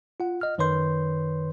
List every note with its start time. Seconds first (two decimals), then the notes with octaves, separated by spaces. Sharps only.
0.20 F4 F#5
0.41 D#5 F6
0.58 F#2 D#3 B4 C#5 C6 G6